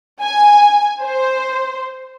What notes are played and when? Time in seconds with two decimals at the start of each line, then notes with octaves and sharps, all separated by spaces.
0.22 G#5
1.03 C5